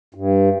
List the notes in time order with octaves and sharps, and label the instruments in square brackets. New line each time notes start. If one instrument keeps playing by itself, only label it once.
[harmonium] G2